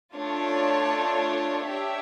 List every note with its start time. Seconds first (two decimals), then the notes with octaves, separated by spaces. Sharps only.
0.15 A3 D4 F4 C#5
1.68 D4 G4 C#5 E5